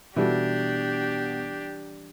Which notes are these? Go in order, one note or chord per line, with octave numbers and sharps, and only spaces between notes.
B2 E3 G3 D4 F#4 G4 A4